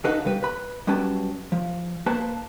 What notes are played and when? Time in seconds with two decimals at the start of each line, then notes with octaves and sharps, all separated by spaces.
0.04 C#3 D4 D#4 A4 B4 F#5
0.25 C#3 G3 B4
0.43 B4 B5
0.87 F#2 G3 C#4 B4 A5
1.52 F3
2.06 A#3 B4 C5 A5